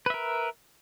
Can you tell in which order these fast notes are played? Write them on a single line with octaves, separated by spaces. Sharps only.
B4 E5 A#4